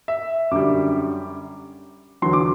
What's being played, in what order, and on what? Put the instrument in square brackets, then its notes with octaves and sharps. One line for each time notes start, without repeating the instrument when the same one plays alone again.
[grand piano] E5
F#2 D3 G3 D6
E2 D3 F#3 C6
D6